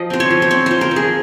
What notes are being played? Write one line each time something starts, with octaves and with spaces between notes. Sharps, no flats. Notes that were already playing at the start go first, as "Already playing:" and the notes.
Already playing: F3 D#5
C4 C5
C#5
F3
C5
C4 C#5
F3 C5
A#4
F3
G#4